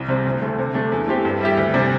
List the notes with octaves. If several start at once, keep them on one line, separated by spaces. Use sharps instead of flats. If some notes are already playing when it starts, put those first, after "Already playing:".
Already playing: C2
C3 G3 C4
D2
D3 A3
C3
A3 D4
E2
E3 A3 C4 G4
G2
G3 E4 G4
D2
C3 G3 D4